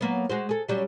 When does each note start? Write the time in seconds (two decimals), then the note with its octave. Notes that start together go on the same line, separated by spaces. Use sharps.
0.01 F#3 A#3 B3
0.30 G#3 F#4 C5
0.49 G#4 A4
0.68 F#3 G3 C#4